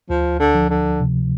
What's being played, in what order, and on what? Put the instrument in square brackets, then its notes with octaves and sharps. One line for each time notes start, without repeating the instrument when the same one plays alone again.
[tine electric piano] D2 [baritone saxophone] F3
[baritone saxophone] D3
[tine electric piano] F3
[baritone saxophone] D3
[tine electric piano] C3